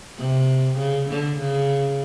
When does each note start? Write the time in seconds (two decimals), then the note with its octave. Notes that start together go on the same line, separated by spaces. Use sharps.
0.19 C3
0.78 C#3
1.10 D3
1.40 C#3